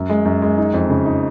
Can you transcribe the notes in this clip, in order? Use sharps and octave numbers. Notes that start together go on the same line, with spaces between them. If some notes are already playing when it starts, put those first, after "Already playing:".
Already playing: F#2
G#3
F#2
G#3
D#4
F2
C#3
D#4